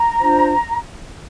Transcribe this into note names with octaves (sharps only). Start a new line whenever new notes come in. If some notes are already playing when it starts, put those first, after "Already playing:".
Already playing: A#5
D4 F4 C5